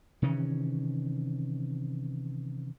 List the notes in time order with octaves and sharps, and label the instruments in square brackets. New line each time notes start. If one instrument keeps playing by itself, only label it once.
[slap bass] C3 D#3 E3 C#4